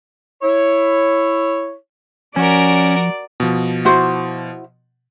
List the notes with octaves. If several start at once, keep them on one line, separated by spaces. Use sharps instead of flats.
E4 C#5
F3 C#4 F#4 A#4 D5
B2 F3
E4 F#4 C5